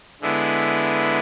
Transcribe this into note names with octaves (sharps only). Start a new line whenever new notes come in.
D3 G#3 B3 E4